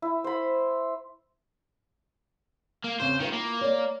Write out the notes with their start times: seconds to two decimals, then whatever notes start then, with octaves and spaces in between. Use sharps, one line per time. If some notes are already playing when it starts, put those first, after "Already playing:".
0.02 E4
0.24 C5 B5
2.84 A#3
3.00 E2 C#3 C4 C5
3.20 D#3 E4 F4 B4
3.33 A#3
3.61 C#5 D5